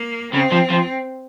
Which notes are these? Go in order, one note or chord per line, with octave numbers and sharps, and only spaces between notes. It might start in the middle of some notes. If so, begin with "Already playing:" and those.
Already playing: A#3
C#3 C4
F3
F3